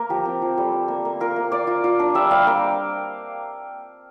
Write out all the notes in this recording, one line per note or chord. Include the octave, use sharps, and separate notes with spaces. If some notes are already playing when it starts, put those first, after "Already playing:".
Already playing: A#3 A#4
F3 G4
C4
F3
G3 A4
G3
A#3
A#3
F4 A#4
A#3
F4 D5
F4
F4
D4
G3 E5
G3 F5
A#3 G5